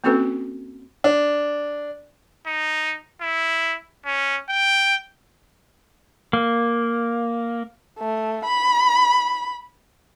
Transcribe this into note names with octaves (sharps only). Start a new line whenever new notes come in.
A#3 C4 C#4 F#4 A4 B4
D4
D#4
E4
C#4
G5
A#3
A3
B5